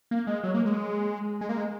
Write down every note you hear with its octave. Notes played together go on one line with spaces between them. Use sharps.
A#3
G#3
F#3
A#3
G#3
G#3
A#3
G#3